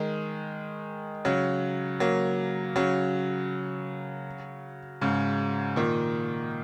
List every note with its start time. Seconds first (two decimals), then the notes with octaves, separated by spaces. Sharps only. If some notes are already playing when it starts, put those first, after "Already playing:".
Already playing: D#3 G#3
1.25 C#3 F#3
2.00 F#3 A#3
2.76 C#3 F#3
5.01 G#2 C#3
5.76 A#2 D#3